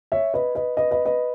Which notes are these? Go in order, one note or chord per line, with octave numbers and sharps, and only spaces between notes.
C#5 E5
B4 D#5
B4 D#5
B4 D#5
B4 D#5
B4 D#5